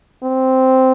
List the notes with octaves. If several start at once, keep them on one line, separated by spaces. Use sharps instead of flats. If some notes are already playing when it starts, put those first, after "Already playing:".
C4